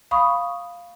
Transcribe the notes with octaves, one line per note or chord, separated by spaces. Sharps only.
F5 B5 C#6 D#6